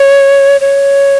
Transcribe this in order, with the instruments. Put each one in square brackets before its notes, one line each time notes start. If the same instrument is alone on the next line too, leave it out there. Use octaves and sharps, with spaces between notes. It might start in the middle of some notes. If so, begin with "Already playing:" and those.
Already playing: [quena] C#5
C#5